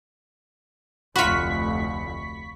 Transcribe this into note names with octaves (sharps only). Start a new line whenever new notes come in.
F1 D2 F4 F#4 B5 C#6 B6